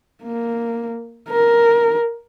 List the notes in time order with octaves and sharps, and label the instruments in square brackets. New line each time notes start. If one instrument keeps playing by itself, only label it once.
[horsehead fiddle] A#3
A#4